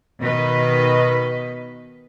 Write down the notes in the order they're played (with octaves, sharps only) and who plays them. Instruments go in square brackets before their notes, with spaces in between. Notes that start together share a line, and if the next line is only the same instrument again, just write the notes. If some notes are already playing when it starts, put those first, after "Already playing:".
[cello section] B2 D#3 B4 D#5